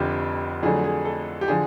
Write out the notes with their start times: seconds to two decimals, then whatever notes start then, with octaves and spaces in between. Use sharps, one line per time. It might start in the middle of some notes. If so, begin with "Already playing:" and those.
Already playing: F1 F2 D3 G4
0.63 F2 D3 F#3 A3 G#4
0.84 G#4
1.05 A4
1.41 G4
1.48 D3 F3 G#4